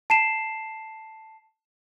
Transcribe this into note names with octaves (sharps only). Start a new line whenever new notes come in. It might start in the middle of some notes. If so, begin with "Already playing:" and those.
A5 C7 E7